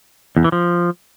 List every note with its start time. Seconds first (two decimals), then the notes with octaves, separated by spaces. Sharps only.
0.37 E2
0.44 E3
0.52 F3